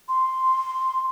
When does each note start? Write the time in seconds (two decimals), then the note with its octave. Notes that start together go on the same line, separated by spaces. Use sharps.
0.09 C6